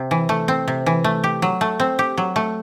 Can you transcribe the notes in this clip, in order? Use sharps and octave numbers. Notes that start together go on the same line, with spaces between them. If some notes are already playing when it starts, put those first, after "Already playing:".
Already playing: C3 C4
E3
A3
C4
C3
E3
A3
G4
F#3
A3
C4
G4
F#3
A3